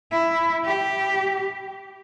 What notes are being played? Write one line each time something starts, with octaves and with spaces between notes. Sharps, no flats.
E4
G4